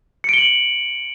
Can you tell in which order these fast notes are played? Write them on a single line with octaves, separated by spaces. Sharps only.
C#7 D7 G7 F#7